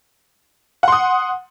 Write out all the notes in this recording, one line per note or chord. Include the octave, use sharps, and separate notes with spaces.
F#5 C6 D#6